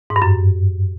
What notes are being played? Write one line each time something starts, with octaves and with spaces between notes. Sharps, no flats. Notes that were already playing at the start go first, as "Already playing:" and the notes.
G#2
G2
F#2